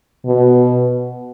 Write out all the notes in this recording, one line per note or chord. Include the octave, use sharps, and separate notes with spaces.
B2